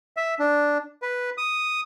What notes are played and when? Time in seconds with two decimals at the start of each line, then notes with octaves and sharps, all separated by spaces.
0.17 E5
0.39 D4
1.02 B4
1.38 D#6